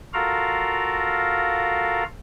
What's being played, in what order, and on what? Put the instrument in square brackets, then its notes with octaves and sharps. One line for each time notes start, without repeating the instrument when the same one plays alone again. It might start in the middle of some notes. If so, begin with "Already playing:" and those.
[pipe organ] F4 F#4 A4 A#4 F5 A#5